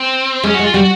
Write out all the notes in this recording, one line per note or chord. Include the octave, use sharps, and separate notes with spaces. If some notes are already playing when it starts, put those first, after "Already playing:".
Already playing: C4
G#3 C#4
F#4
G#3
F4
G3 F#4